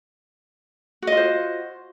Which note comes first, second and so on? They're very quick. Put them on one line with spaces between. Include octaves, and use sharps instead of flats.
F#4 D#5 F4 C5